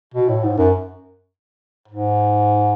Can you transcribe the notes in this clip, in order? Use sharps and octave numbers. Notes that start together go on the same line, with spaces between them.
B2
A2
G#2
F#2
G#2